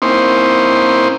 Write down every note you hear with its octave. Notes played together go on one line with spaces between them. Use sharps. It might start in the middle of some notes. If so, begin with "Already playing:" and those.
A#3 C4 C#4 D#4 E4 C5